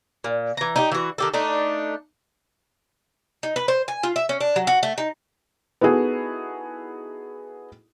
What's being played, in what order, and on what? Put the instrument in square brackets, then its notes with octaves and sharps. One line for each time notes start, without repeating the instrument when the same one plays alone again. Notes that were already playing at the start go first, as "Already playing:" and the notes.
[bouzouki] A#2
E3 A#5
D#4 E4 G4
E3 F#4
D#3 G4 A4
A3 D4 D#4
D#4
B4
C5
G#5
F4
E5
C#4
D4
F#3
F#4
A3
D#4
[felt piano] B3 D#4 E4 F#4 G#4 A4